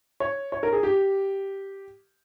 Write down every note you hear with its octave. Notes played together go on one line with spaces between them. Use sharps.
C#5
C#5
A#4
G#4
G4